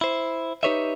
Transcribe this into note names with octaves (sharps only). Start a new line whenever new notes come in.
E4 C5
D#4 G4 B4 C#5 D#5 E5